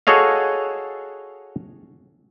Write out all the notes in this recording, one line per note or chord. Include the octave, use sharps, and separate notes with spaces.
F#4 G#4 A4 C#5 D#5 F5